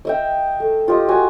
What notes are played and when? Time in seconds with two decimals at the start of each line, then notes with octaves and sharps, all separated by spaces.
0.05 D#5 E5 G5
0.60 A3
0.88 F4 G4 D#5
1.09 F#4 G#5